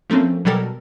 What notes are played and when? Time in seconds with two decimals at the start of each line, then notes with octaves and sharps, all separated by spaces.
0.10 F3 A3 A#3 C4 C#4
0.45 B2 F#3 G3 A4 A#4